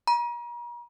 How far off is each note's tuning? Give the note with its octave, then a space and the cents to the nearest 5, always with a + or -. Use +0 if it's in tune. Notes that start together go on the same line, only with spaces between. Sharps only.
A#5 +40